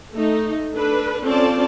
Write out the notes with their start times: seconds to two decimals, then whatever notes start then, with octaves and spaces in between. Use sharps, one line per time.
0.13 A3 D#4
0.75 D4 A4 B4
1.24 C4 C#4 F4 A4 D5 A5